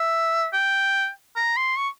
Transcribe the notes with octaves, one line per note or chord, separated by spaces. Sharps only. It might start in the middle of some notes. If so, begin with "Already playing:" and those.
Already playing: E5
G5
A#5
C6
C#6